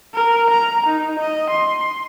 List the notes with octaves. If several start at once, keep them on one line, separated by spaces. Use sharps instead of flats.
A#4
A#5
D#4
D#5
C6